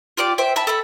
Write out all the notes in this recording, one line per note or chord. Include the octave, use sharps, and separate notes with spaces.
F4 G4 D5 D6
C5 E5 G5
E5 A5 B5
A4 A5 B5